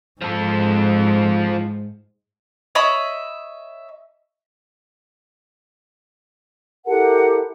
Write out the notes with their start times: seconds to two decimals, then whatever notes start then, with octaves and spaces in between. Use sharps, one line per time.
0.22 G#2 F3 A4
2.75 C#5 D#5 E5 B5
6.87 E4 G4 A4 A#4 F#5